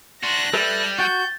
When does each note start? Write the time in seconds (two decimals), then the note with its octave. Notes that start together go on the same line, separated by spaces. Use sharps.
0.23 D4 F#4 C6 F#6 A#6
0.54 G3 A4 B4 E5 A6
0.99 F#4 G5 G6 A6